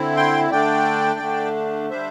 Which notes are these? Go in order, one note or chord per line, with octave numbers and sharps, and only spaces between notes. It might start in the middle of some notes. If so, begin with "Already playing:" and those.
Already playing: D3 C4 E4
G5 C6
D3 A3 D4 D5 G5
D3 A3 D4
D3 G3 D4 C5 E5